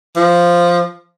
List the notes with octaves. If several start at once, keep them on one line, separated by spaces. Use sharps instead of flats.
F3